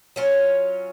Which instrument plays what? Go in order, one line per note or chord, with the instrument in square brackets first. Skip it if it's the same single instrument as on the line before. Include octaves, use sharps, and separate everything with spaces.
[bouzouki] F#3 C#4 F4